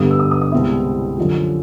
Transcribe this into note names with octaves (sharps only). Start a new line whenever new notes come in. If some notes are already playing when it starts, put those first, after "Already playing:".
Already playing: G2 D3 G3 B3 D#6
E6
D#6
D#6
D#6
C2 B2 G#3 C4 E4
F#2 D3 F3